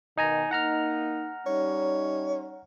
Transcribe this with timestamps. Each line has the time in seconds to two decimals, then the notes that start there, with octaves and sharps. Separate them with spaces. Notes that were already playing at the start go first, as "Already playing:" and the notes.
0.17 B2 D#3 D#4 G#5 A#5
0.51 A#3 D#4 F#5 A#5 F6
1.46 G3 C#4 D#4 C#5